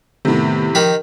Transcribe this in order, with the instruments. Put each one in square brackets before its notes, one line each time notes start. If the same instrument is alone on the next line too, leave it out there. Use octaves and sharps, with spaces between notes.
[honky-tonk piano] A2 C3 [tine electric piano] D#3 A3 B3
[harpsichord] D#3 G4 B5 [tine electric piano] F3 D#5